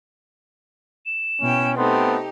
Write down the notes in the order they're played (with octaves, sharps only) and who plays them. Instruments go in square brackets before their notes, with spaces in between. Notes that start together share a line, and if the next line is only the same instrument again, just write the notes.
[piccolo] E7
[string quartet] B2 E4 G5 [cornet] C#4
[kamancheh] A3 C4 [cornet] B3 [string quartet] D#4 G4 [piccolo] C6